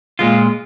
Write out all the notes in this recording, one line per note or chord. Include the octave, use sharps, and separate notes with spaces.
A#2 G#3 F4